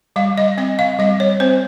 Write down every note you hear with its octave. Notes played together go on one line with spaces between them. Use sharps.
G3 F5
D#5
C4 D#5
F5
G3 D#5
C#5
C4 C5